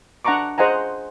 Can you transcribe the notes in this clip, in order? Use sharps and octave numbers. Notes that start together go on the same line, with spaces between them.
D4 F#5 A5 A#5 C#6 D6
G#4 C5 D#5 F#5 G#5 A#5